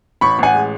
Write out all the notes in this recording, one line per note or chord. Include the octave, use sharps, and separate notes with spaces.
A1 B5 C#6
A1 F#5 G#5
G#3